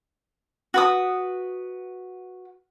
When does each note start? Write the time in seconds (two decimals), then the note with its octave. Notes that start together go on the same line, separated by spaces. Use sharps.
0.74 F#4 B4 D#6